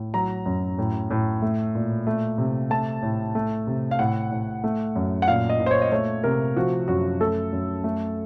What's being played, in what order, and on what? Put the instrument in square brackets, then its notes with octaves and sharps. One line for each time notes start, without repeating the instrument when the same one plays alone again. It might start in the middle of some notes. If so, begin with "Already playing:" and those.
Already playing: [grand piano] A2
F#3 A#5
F#2
A2
A2
A3
A#2
A3
C3
A3 A5
A2
A3
C3
F5
A2 F#5
A2
A3
F#2
F#5
A#2 F5
D#5
A#2
C5
C#5
D#5
A3 C#5
C3 A#4
F3 F#4
F#2 F#4
A3 A4
F#2
A3